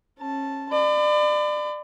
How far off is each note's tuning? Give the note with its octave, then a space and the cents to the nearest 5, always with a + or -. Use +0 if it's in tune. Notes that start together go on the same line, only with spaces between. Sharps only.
C#4 -25 A5 +0
D5 +30 B5 +40